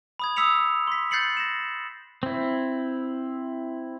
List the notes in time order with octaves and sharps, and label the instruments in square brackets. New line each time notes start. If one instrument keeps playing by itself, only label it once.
[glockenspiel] B5 D#6 G#6
D#6 E6 B6 C#7 F7
C6 B6
F#6 G6 A6 C7 C#7 F#7
A#6 E7
[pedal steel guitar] C4 E4